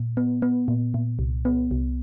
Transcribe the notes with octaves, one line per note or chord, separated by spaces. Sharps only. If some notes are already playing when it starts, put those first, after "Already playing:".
Already playing: A#2
B3
B3
A#2
A#2
C2
B3
C2